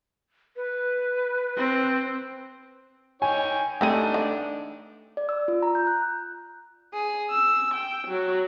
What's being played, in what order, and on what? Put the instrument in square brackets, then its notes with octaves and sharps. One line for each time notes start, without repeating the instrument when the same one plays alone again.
[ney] B4
[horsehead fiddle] C4
[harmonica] D#4 C#5 G5 [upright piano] G#5
[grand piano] A3 D#7 [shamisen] C4 G4 G#4 [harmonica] D4 D#4
[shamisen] D3 E3
[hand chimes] D5
E6
F4
A#5
G6
F#6
[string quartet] G#4
E6
G5
F#3